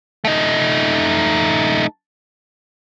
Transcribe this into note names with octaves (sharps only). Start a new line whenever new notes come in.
A3 D#4